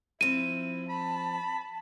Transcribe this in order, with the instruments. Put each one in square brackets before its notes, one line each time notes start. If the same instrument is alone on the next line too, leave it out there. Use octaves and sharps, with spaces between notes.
[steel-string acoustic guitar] F3 C4 [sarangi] E4 [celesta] D#7
[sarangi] A5 [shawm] B5